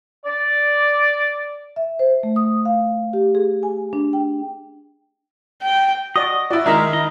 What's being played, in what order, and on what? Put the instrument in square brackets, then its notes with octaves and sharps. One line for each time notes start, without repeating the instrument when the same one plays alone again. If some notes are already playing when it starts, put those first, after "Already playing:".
[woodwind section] D5
[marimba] E5
C5
A3
D#6
F5
G4
G#4
G#5
D4
G5
[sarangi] G5
[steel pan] F#4 D5 [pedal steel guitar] D#5 [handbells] D#6
[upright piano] E4 F#4 [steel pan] D5
[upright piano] D#3 D#4 A#4 [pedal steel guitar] G#3 [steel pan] E5 A#5
[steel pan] E4 [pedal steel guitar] D#5